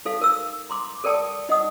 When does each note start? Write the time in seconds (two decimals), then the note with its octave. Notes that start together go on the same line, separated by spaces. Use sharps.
0.05 D#4 A4 F5
0.21 A#4 E6
0.70 A#5 C6 D6
1.04 A4 A#4 D5 G5 A5 D#6
1.49 D#4 D#5 F#5 D#6